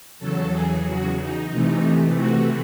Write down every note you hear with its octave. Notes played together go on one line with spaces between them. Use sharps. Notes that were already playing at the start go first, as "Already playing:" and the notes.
E2 C#3 F#3 A4
G#4
F#4
D#4
C3 E3 A3
F#4